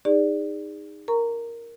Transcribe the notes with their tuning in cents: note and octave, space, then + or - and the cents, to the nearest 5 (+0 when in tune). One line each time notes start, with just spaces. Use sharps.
D#4 +0 G#4 -30 D5 +0
A#4 +0 A#5 -10 C#6 +10